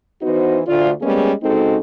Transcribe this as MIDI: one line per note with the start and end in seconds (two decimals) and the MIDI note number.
0.22 0.60 52
0.22 0.60 59
0.22 0.60 63
0.22 0.60 66
0.22 0.60 72
0.67 0.90 38
0.67 0.90 65
0.67 0.90 74
1.01 1.32 55
1.01 1.32 56
1.01 1.32 58
1.01 1.32 59
1.01 1.32 61
1.01 1.32 68
1.43 1.78 49
1.43 1.78 56
1.43 1.78 60
1.43 1.78 63
1.43 1.78 66
1.43 1.78 69